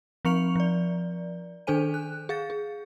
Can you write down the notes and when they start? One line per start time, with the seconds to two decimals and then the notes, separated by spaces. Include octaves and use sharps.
0.25 F3 C4 C#6 C#7 F7
0.56 F3 D5
1.67 D#3 D4 A4 C5 G#5 D#7
1.94 F#6
2.29 G#4 F5 A6
2.50 G#4